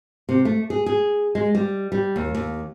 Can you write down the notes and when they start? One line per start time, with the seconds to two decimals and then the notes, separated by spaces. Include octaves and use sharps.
0.29 C3
0.45 A3
0.70 G#4
0.86 G#4
1.35 G#3
1.55 G3
1.92 G3
2.16 D#2
2.35 D#2